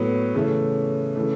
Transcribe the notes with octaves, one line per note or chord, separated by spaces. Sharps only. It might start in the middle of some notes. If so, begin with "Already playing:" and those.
Already playing: A2 F#3 B3
C#3 E3 A3 C#4
C#3 E3 A3